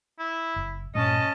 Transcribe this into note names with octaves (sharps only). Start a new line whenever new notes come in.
E4
F#1
G2 A#2 G#3 C#4 D#5 A5